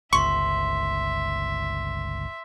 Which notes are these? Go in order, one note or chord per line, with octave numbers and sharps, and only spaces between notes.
G1 C#2 E5 C6 C#6